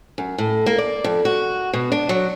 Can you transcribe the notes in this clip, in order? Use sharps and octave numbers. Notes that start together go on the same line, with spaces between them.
F#2
A2
A#3
D5
F2
F#4
B2
D4
F#3